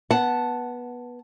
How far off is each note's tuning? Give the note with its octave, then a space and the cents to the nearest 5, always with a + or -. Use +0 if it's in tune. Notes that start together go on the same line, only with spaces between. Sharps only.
B3 -15 F#5 +0 A5 +0